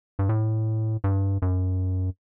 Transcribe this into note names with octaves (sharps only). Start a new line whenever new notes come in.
G2
A2
G2
F#2